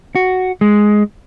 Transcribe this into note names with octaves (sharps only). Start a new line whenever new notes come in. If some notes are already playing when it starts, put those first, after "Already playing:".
F#4
G#3